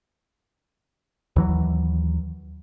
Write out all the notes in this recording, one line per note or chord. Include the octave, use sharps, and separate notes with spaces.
D#2 E3 F#3